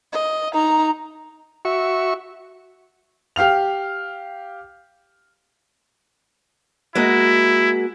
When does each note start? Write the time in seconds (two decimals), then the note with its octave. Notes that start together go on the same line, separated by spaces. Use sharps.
0.12 D#5
0.53 D#4 A#5
1.65 F#4 E5 C#6
3.36 G4 F5 F6 F7
6.95 G#3 A#3 E4 F#4